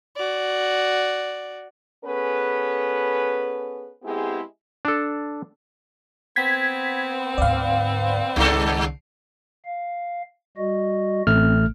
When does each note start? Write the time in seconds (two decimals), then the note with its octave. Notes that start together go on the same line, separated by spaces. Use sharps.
0.16 F#4 D5
2.05 B3 C#4 G#4 A4 B4
4.02 G#3 B3 C4 E4 G4 G#4
4.85 D4 A4
6.36 B3 C4 G#6 B6
7.38 D2 G#2 D5 F5
8.36 C#2 G2 D#3 A4
9.65 F5
10.57 G3 F#4 D#5
11.27 A1 A3 C4 F6